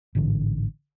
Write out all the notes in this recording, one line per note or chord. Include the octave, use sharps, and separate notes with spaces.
A1 G#2 D3 E3